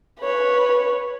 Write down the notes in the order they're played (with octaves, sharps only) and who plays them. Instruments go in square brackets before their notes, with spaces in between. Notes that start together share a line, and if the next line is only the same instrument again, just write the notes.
[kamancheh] B4 C#5